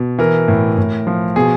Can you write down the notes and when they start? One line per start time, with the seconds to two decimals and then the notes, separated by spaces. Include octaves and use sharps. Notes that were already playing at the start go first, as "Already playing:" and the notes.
Already playing: B2
0.18 E3 A#4
0.48 A2
0.78 A2
1.07 F3
1.36 B2 G#4